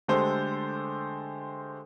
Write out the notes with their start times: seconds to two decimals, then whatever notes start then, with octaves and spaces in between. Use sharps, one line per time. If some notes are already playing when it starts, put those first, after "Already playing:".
0.08 D3 G#3 A3 G4 A4 C5